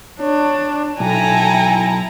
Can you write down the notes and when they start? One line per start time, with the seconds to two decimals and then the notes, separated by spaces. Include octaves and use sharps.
0.20 D4 C#5
1.00 B1 E4 A4 G5 G#5 A#5